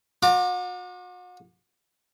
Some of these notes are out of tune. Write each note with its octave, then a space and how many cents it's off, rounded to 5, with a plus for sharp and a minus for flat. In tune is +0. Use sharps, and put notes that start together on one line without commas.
F#4 -40 A#5 +0 D6 +20